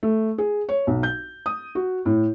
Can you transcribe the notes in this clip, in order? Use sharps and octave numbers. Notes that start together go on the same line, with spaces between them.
A3
G#4
C#5
B1
G6
D#6
F#4
A2